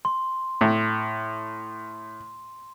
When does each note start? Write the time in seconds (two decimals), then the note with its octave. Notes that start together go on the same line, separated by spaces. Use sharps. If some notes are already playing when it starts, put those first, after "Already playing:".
0.05 C6
0.61 A2